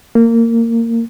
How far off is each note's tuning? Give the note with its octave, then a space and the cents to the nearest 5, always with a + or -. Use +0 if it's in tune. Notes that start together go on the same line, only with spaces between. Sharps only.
A#3 -20